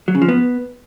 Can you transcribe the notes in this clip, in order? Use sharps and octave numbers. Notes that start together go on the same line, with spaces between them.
F#3
C#3
F3
B3